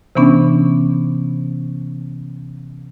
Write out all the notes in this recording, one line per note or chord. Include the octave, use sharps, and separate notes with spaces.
C3 E3 B3 C#4 D4